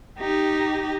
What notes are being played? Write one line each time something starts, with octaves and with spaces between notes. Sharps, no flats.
D#4 G4